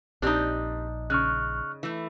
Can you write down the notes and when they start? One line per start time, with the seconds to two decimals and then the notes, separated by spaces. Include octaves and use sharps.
0.22 A#1 C4 D4 D#4 G4 D5
1.10 C#3 C#6 F6 F#6
1.83 E3 A3